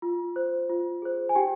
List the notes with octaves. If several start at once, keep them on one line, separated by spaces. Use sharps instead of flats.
F4
C5
F4
G#4 C5
G#5
D#4 G4 G5